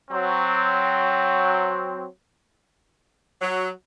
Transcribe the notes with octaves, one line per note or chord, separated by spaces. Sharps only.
F#3 C4
F#3